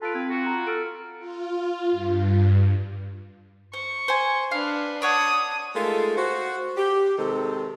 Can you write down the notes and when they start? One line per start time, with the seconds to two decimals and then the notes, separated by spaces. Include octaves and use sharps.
0.02 F4 A4 B4 A5 D7
0.15 C4 G#6
0.29 F4 F#4
0.46 A#5
0.67 A4 F6 D7
1.19 F4
1.91 G2
3.73 C5 C#6
4.08 C5 G#5
4.51 D4 B4 F5
5.02 D4 C#5 F#5 D#6
5.75 G#3 A3 D#4 F4 A4 A#4
6.17 F#4 C5
6.77 G4
7.18 C3 D#3 G#3 C4 A4